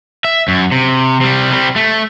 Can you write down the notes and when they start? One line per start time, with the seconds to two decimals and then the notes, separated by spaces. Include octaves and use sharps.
0.25 E5
0.48 F#2
0.72 C3
1.21 C3 G3
1.52 G3 C4
1.76 A3